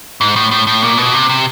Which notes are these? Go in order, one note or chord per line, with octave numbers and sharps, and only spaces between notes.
G#2
A2
A2
A2
A#2
B2
C3
C3